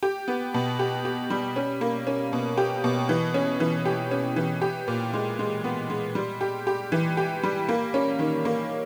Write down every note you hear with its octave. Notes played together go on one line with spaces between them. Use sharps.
G4
B3
B2
G4
G4
G3
C#4
A#3
C#4
B2
G4
B2
E3
C#4
E3
G4
C#4
E3
G4
A#2
G#3
G#3
B3
G#3
G3
G4
G4
E3
G4
G3
A#3
C#4
D#3
A#3